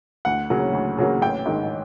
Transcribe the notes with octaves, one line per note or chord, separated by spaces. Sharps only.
D2 F#5
C#3 F#3 A#3
D2
C#3 F#3 A#3
A1 G5
G#2 D#3